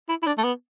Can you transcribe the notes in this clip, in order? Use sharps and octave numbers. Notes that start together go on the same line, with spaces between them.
E4
E4
D4
A3
B3